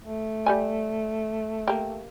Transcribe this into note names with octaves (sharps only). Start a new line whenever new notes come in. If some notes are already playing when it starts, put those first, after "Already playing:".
A3
G3 G4 G#5
A#3 G4